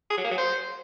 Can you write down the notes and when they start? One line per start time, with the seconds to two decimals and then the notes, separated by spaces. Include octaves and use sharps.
0.10 G#4
0.17 F#3
0.24 A#3
0.31 F#3
0.38 C5